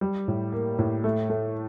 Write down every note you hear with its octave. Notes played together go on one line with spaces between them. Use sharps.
G3
A2
A#3
A2
A3
A3